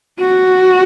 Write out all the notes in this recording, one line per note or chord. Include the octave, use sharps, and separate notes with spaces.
F#4